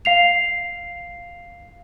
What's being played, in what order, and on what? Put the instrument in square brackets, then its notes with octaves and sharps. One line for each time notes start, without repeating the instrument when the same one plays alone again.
[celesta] F5 C7 F7